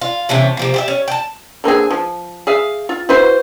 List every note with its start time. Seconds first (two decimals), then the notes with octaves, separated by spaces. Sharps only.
0.01 F4
0.29 C3 E3 A3 C#4
0.57 C3 F3 A#3
0.74 G4 G#4 E5
0.88 C#4
1.08 G5 A5
1.64 D3 A#3 C4 G#4
1.91 F3
2.47 G#4 E5 F5
2.89 F4
3.09 E4 F#4 B4 C5